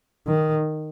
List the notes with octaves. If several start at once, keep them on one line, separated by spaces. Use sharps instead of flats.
D#3